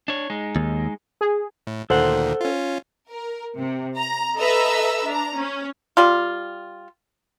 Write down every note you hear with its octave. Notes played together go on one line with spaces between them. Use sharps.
D4 C#5
G#3 D#4
D#2
G#4
A2
D2 A#2 D#3 A4 C5 F#5
C#4 F4
A#4
C3
A#5
A4 B4 D#5 E5 A#5 E6
D4 A#5
C#4
G3 F4